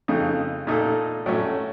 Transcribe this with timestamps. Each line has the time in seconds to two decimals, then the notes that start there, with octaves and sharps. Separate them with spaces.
0.08 F2 C#3 A3 D#4
0.67 A#2 A3 D#4 A4
1.26 A2 F#3 A3 C#4